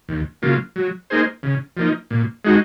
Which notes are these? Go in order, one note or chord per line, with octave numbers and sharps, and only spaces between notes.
D#2
C#3 F#3 A#3 F4
F#3
A#3 D#4 G#4 C5
C#3
F3 A#3 D#4
A#2
G#3 D#4 F#4